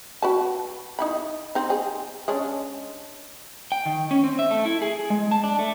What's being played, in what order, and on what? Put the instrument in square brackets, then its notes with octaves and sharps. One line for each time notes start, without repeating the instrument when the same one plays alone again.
[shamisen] F#4 B4 A5
D#4 E4 B5
C4 D#4
G#4
G#3 C#4 D4
[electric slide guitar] G5
D#3
C#4
C4
E5
A3
E4
G#4
G#3
A5
D4
A3